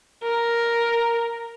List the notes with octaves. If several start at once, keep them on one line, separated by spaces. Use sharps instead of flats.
A#4